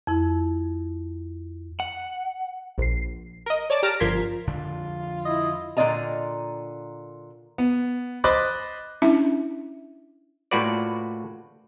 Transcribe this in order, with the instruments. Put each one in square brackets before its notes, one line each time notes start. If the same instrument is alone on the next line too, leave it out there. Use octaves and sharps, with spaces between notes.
[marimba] F2 E4
[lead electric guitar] F#5
[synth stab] A#1 C7
A#4 D#5
C#5 D5 A5 D6
G4 A5 A#5 F6 D7
G1 F3 A#4 C6 G#6 B6
[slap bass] F2 D3 D4 [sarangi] F4
[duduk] E4 [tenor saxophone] D#5
[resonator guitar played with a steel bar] A#2 D3 F4 D5 D#5 A#5
[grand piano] B3
C5 D#5 B5 D6 F#6 A6
[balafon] C#4 D4 E4 E5 A5
[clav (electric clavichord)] A2 A#3 F4 F#4 B4 D5